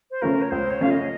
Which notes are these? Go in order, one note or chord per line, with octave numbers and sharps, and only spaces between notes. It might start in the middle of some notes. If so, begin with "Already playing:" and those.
C5
C#3 A3 C#4 F4 A#4
C#5
C#2 C5
C#5
C#3 A3 C#4 F4 F5
D#5